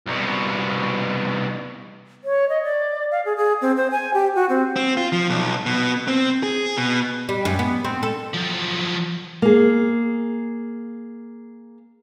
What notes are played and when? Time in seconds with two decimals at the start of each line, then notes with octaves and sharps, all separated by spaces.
0.07 C2 B2
2.24 C#5
2.49 D#5
2.63 D5
3.11 F5
3.25 G#4
3.37 G#4
3.61 C4
3.77 C5
3.91 G#5
4.14 G4
4.35 F#4
4.49 C4
4.76 C4
4.97 F4
5.12 F3
5.30 B1
5.66 B2
6.08 C4
6.43 G#4
6.77 B2
7.29 G3
7.45 F#2
7.59 B3
7.84 C4
8.03 A4
8.34 F3 F#3
9.42 A#3 G#4